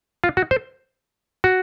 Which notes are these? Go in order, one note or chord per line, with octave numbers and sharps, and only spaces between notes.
F4
F#4
C5
F#4